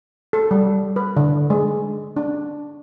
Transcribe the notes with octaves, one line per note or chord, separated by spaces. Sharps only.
A4
G3
B4
D3
G#3
D4